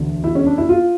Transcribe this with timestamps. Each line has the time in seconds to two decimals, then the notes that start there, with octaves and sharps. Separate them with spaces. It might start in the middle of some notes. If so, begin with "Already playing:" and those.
Already playing: E1 D2 D3
0.24 E4
0.35 C#4
0.46 D4
0.58 E4
0.69 F4